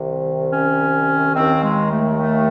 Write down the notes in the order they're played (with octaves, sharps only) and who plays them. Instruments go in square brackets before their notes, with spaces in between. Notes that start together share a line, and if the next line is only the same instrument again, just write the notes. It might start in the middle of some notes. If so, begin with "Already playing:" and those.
Already playing: [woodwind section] C2 C3 D#3
C#4
D#2 D#3 C4
G#3
A3
A3